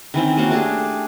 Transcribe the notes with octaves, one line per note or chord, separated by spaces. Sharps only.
D#3 E3 C4 C#4
A#3 C#4 F#4 C5
A3 D4 G4 G#4